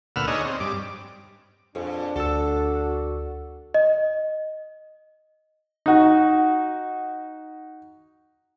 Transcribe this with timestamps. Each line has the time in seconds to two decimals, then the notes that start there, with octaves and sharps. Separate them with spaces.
0.16 D2 A#2 B4 F#5 E6 F6
0.27 D4 D#4 G#4 C#5 D#5
0.45 C4
0.60 G2 D6
1.75 F2 A#2 D4 G#4
2.16 D2 F#4 A4 E6
3.74 D#5
5.86 D#4 F#4